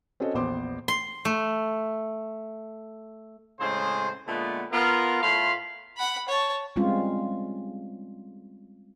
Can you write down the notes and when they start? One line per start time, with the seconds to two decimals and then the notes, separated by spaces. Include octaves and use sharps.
0.20 C4 C#4 F#4 A4 D#5
0.34 A#1 E2 B3 C5 C6 D6
0.88 C6
1.25 A3
3.60 A2 C#3 G#3 C4 G#4 C5
4.27 A#2 D3 G#3 A3 B3
4.72 B3 F4 A#4
5.23 A2 A3 F4 F5 B5 C6
5.97 F#5 B5
6.28 C#5 A5
6.76 G3 G#3 C4 C#4 F4